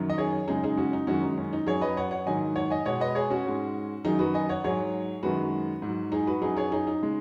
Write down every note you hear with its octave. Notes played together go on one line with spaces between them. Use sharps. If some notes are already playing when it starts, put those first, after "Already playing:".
Already playing: F#2 D#3 F#3
D#5
G#4 C#5
F#2 C#3 G#3 D#4 G#4
D#4 G#4
C#4 F#4
D#4
F#2 D#3 G#3 C#4 F#4
D#4
C#4
D#4
F#2 F#3 G#4 C#5
B4 D#5
C#5 F#5
C#5 F#5
G#2 D#3 F#3 D#5 G#5
C#5 F#5
D#5 G#5
B2 G#3 C#5 F#5
B4 D#5
G#4 C#5
C#4 F#4
G#2 G#3
F#2 D#3 F#3 D#4 G#4
F#4 B4
D#5 G#5
C#5 F#5
G#2 F#3 G#4 C#5
F#2 D#3 G#3 F#4 B4
G#2 F#3
D#4 G#4
F#4 B4
F#2 F#3 D#4 G#4
G#4 C#5
D#4 G#4
D#4
C#3 G#3